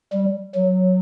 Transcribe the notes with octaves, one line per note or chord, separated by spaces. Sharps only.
G3
F#3